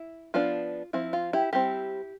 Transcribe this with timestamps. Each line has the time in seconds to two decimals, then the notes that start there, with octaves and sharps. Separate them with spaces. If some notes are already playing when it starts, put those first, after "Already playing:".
Already playing: E4
0.34 F3 B3 D4 F4
0.93 F3 C4 E4
1.13 F4
1.33 E4 G4
1.53 G3 C4 E4 G4